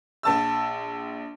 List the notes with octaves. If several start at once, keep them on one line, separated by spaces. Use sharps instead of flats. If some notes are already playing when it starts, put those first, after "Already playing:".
A#1 A5 E6